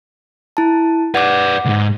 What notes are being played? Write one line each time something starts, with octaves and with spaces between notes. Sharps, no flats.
E4 A5
B4 D5 F#5 D6
C#2 G#2